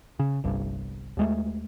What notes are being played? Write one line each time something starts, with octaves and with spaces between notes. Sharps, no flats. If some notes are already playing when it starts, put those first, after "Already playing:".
C#3
G1 C2 G2
D#2 G#3 A3